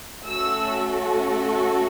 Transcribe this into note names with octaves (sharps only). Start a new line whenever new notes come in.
A3 C#4 F#4 A4 E6